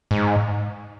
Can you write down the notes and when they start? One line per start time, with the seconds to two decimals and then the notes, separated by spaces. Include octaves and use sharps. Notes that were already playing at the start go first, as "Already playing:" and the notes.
0.11 G#2